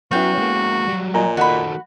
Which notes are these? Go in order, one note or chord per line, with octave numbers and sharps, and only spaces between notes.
F#3 B3 C#4 E4 F#4 F5 G5
G#3 A#3
F#3 G3
A#2 D#5 G#5 A#5
D#3 A3 F#4 D#5 B5